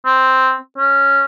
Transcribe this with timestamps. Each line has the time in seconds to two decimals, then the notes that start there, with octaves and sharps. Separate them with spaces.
0.06 C4
0.78 C#4